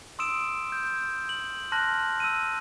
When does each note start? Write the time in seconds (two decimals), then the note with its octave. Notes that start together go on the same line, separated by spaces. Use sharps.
0.19 C6 D#6 E6 D7 E7
0.72 G6
1.29 F#7
1.72 A5 C6 F6 F#6 A#6 F#7
2.20 E6 D#7